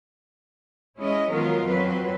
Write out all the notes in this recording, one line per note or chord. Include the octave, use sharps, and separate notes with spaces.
G#3 C#4 E4 D#5
D#3 F3 F#3 B3 F4 A#4
F2 F#3 C4 B4